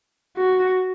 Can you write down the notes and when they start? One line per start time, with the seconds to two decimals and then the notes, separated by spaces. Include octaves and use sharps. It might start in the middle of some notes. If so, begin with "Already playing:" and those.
0.37 F#4